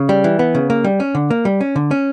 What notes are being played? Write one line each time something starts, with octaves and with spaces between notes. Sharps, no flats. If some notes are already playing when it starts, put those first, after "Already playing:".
Already playing: C#3
G3
E3
B3
C#3
A#3
G3
C#4
D3
A#3
G3
C#4
D3
C#4